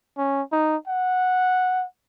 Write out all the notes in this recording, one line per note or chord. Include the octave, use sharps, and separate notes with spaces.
C#4
D#4
F#5